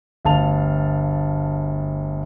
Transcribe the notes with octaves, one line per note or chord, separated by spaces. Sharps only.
G1 D2 F5 A5 F7